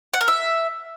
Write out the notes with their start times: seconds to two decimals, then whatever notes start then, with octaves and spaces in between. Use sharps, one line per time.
0.14 F#5
0.21 A#4
0.28 E5